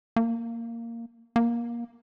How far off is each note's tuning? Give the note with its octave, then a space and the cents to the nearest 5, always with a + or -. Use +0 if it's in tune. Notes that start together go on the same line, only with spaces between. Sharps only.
A#3 -10
A#3 +20